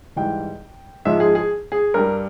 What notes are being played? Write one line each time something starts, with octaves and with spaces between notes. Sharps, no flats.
G#2 E3 G3 G5
G#2 F3 G#3 E5
G#4
G#4
G#4
G2 G3 A#4